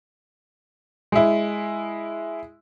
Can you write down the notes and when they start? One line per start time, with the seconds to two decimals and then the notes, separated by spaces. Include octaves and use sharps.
1.12 G#3 E4